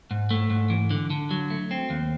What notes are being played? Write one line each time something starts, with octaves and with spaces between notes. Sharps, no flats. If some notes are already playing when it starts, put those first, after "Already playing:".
G#2
A3
G#2
E3
D3
D3
F#3
A3
C4
D#2